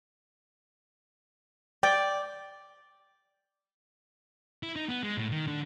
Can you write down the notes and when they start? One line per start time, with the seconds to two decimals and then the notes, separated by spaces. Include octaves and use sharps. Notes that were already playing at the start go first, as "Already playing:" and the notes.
1.83 D5 G5
4.63 E4
4.76 D#4
4.89 B3
5.03 G#3
5.17 A2
5.32 D#3
5.47 D3